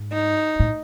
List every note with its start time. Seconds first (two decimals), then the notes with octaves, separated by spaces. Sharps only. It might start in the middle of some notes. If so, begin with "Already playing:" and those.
Already playing: G#2
0.12 D#4
0.60 A2